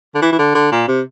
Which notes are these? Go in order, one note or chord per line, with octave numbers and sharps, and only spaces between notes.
D3
E3
E3
D3
D3
A#2
C3